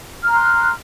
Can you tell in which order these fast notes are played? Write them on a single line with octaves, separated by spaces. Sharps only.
F6 A#5 C6 F#6